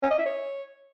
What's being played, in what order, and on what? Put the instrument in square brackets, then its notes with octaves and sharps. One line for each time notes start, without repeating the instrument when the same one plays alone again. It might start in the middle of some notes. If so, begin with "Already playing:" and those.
[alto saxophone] C#4
D#5
E4
C#5